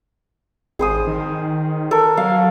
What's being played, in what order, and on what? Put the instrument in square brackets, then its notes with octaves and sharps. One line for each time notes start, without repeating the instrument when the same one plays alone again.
[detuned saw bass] G#1 [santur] G#4 C5 D#6
[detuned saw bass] D#3
[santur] A4 A#4
[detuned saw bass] F#3 [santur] F5